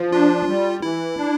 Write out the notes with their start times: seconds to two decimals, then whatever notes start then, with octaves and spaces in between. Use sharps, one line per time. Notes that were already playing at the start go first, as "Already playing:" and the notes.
Already playing: F3
0.12 D4 F4
0.47 G3
0.82 E3 E4
1.16 D4